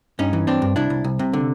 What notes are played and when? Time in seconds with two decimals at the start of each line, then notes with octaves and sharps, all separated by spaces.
0.19 G2 C#4 D#4
0.33 E3
0.47 G2 C4 D4
0.62 G2
0.76 C2 D4 E4
0.90 C2
1.04 C2
1.19 C3
1.33 D3